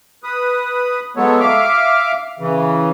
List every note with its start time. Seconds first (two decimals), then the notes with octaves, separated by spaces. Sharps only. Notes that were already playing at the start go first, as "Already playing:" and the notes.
0.24 B4 D#6
1.16 F#3 G#3 B3 A4 C#5
1.40 E5 F5 D6 F6
2.39 C#3 E3